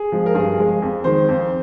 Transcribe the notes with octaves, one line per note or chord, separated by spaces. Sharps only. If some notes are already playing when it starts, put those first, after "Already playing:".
Already playing: G#4
F3 G#3
A#4
G2 G#4
F3 G#3
F2
D#3 G#3 C5
F2